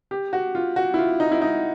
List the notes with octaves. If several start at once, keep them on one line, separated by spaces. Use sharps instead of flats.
G4
F#4
F4
F#4
E4
F4
D#4
E4
D#4